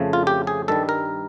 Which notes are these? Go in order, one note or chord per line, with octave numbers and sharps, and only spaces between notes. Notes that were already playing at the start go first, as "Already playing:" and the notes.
Already playing: F2 C#3 F3 A3
F4
G4
G#4
G2 D#3 G3 A4
A#4